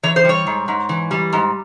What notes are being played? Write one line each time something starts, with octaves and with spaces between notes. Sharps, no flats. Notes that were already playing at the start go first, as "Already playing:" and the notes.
E3 C#5
C5
G3 C#5
G#2
G#2
E3
G3
G#2